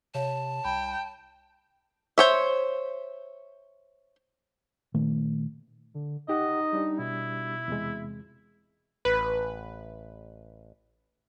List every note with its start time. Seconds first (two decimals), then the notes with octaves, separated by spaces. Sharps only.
0.14 C3 C#5 E5 F5 A5
0.65 C2 G5 B5
2.18 C5 C#5 E5
4.94 A#2 D#3 A3
5.94 D3
6.28 C#2 D#4 G4 D#5 F#5
6.73 G3 D4 G4
6.99 B2 E4
7.68 E2 C3 G#3
9.05 A1 B4